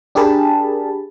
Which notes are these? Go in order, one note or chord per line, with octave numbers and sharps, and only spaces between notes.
D4 G4 G#4 A#4 A5 B5